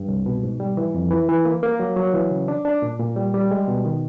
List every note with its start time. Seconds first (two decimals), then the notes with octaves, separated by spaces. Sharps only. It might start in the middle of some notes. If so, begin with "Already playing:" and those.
Already playing: G2
0.08 C2
0.26 B2
0.43 G#2
0.60 G3
0.77 E3
0.94 F2
1.11 E3
1.29 E3
1.45 A#3
1.63 A#3
1.80 F#3
1.96 F#3
2.14 E3
2.31 C#3
2.48 D4
2.65 D4
2.82 A#2
3.00 A#2
3.16 G3
3.34 G3
3.51 G#3
3.68 B2
3.85 D#3